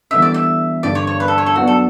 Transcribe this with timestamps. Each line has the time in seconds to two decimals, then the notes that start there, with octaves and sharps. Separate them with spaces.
0.11 E3 G3 B3 D4 A4 E5
0.22 D5
0.34 E5
0.83 G2 D3 G3 D5
0.95 C#5
1.07 C#5
1.20 B4
1.28 A4
1.38 C#5
1.46 A4
1.56 F#3 B3 D4 F#4
1.67 A4